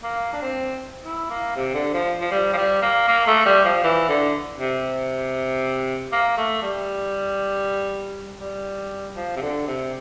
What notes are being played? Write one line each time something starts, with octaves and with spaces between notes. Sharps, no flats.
A#3
D4
C4
E4
A#3
C3
D3
F3
F3
G3
F3
G3
A#3
A#3
A3
G3
F3
E3
D3
C3
A#3
A3
G3
G3
F3
C3
D3
C3